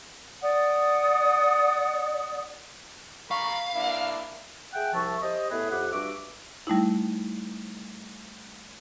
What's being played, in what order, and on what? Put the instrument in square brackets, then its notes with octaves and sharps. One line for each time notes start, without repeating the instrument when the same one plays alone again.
[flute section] D5 F#5 D#6
[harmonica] A#4 B5 C#6 [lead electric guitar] F5
[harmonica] A#3 D4 E4
[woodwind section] G#4 E5 F#5 G5
C2 F3 E5 A5 C#6
G4 C5 D#5
A2 B3 G#4 B4 E5
F2 G4 F#5
G2 F#4 E5 D6
[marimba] G3 A3 D#4 E4